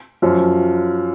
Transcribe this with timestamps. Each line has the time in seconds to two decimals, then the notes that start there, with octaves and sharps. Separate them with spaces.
0.22 F#2 F3